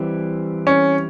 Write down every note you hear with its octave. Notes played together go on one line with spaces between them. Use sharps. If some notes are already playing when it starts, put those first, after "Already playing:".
Already playing: E3 G3 C4
C#4